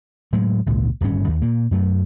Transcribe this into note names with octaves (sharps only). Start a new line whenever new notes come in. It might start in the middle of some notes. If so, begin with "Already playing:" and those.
A2 F#3 G#3
G#1 C#2 A#2 G#3
D1 G#1 G2 C#4
D#2
A#2 A#3
F#2 F#3 A3